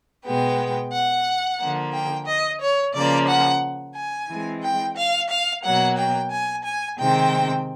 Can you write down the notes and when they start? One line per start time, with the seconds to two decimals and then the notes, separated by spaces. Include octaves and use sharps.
0.25 B2 G#3 B3 G5
0.92 F#5
1.59 D3 F3 A#3
1.93 G5
2.27 D#5
2.60 C#5
2.94 C#3 F3 A#3 D5
3.28 F#5
3.95 G#5
4.29 E3 G#3 C4
4.62 G5
4.96 F5
5.29 F5
5.63 B2 F#3 A#3 F#5
5.97 G5
6.31 G#5
6.65 G#5
6.98 C3 D#3 G#3 C4 G5